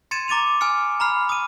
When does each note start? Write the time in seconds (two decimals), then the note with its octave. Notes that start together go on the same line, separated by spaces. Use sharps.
0.11 C6 G#6 A6 C#7 D#7 E7
0.28 A#5 D6 A6 D#7 F7
0.61 G#5 D#6 F6 C#7
1.00 A#5 B5 F6 C7
1.29 D#6 D#7